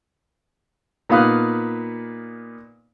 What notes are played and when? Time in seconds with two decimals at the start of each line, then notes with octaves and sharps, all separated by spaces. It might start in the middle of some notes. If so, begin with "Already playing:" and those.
1.09 A#2 B3 D#4 F5 D#6 F#6